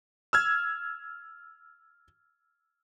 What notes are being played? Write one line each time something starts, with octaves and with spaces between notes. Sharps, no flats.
E6 F6 G#6